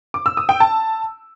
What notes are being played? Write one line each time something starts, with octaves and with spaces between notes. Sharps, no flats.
D6
E6
D#6
G5
A5